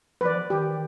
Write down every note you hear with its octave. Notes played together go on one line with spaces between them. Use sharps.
E3 F3 B4 D5
F3
D#3 G4